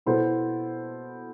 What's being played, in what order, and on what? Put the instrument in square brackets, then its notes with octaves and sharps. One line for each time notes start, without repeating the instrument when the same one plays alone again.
[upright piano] B2 B3 E4 A4 C5